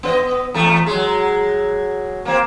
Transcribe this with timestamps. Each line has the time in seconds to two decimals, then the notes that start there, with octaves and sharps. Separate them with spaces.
0.03 B3 B4 D#5
0.54 E2 A3
0.86 F#3 G#3
2.25 A#3 C4